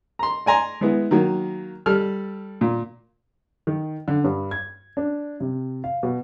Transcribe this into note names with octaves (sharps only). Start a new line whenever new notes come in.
A#5 C6
D5 G#5 A#5 C6
G#3 B3 E4
D#3 F#3 A#3
G3 A4 F6
A#2
D#3
D3
G2
G#6
D4
C3
F5
B2